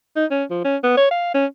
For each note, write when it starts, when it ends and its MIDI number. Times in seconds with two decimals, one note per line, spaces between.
0.16 0.25 63
0.31 0.44 61
0.50 0.63 53
0.64 0.77 61
0.83 0.96 59
0.97 1.10 73
1.11 1.32 77
1.34 1.46 61